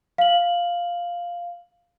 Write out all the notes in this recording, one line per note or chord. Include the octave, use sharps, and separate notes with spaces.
F5 F#7